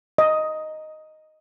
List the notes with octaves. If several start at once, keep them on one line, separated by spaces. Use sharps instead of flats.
D#5